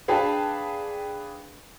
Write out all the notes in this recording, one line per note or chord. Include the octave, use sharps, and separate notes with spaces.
D4 G#4 B4 F5 G5 A5